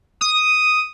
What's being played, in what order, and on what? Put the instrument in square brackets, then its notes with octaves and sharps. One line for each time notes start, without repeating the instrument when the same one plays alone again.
[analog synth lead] D#6